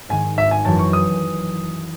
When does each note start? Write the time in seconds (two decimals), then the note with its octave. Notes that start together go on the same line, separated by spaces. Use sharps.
0.09 G#2 D#3 G#5
0.38 G#1 E5
0.51 G#5
0.65 F#2 E3 A5
0.79 C#6
0.93 D#6